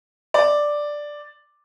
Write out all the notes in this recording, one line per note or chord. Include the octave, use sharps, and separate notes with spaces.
D5